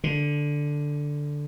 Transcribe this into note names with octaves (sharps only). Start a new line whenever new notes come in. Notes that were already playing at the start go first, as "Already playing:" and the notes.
D3